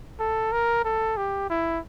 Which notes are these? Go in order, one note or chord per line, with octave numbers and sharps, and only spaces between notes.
A4
A#4
A4
G4
E4